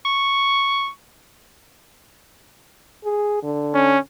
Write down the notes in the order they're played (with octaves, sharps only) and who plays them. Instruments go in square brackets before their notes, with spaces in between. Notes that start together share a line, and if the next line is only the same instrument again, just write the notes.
[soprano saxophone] C#6
[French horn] G#4
D3
[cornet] C#4